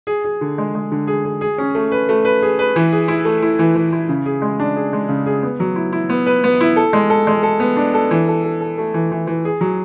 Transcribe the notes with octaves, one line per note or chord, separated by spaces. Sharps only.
G#4
G#4
D3
G#3
G#3
D3
G#4
G#4
G#4
C#4
A3
B4
A3
B4
G#4
B4
E3
G#4
E4
A3
E4
E3
E3
E4
C#3
G#4
G#3
D4
G#4
G#3
C#3
G#4
B3
F#3
E4
E4
B3
B4
B3
E4
A4
G#3
A4
G#3
A4
B3
D4
A4
E3
A4
A4
A4
A3
E3
E3
E3
G#4
F#3